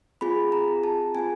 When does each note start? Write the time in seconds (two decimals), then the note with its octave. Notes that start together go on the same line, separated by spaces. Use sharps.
0.21 C4 F4 G#4 B5
0.52 A#5
0.84 A5
1.15 C4 F4 G#4 G#5